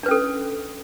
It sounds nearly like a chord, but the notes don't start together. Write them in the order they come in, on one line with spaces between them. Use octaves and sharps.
D4 B4 C#4 A4